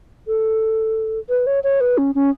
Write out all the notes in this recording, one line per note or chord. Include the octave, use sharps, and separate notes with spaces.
A4
B4
C#5
C#5
B4
C#4
C#4